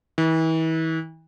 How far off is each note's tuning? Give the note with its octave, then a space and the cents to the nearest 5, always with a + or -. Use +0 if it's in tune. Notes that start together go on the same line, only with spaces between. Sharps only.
E3 -35